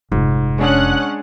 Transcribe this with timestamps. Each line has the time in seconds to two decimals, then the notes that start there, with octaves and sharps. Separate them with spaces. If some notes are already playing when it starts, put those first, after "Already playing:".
0.12 F1 G#2
0.59 G#3 C#4 D4 G#4 F#5 F#6